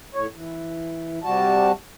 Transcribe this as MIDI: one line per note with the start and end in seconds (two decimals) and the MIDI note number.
0.15 0.27 45
0.15 0.27 73
0.34 1.19 52
1.23 1.72 48
1.23 1.72 55
1.23 1.72 66
1.23 1.72 81